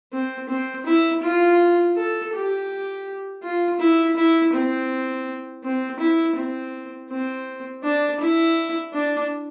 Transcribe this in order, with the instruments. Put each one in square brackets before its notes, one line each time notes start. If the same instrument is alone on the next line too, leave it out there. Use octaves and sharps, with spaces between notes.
[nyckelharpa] C4
C4
E4
F4
A4
G4
F4
E4
E4
C4
C4
E4
C4
C4
D4
E4
D4